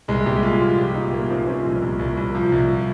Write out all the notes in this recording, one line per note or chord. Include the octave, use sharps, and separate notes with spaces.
C2 G#3
C2 G4
A#2 F4
F3 F4
F3 G4
F3 D#4
A#2 A#3
F3 C4
F3 C#4
C2
C2
C2
C2
F3
C2
F3